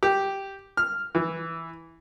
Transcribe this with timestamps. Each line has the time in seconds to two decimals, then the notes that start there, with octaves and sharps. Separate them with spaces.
0.03 G4
0.77 F6
1.15 E3